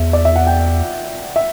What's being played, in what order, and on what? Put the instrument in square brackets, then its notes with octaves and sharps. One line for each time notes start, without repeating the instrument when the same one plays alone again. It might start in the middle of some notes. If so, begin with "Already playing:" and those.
Already playing: [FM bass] E2 [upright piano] E5
[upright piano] D5
E5
F#5
G5
E5